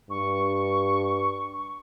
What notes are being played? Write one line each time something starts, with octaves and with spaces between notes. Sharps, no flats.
G2 C#6